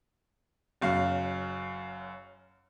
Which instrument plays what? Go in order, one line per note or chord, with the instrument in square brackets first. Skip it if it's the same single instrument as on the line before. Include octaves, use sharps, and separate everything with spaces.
[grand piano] F#1 F#2 F5